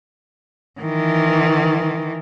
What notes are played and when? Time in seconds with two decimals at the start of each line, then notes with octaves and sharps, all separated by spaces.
0.81 D#3 E3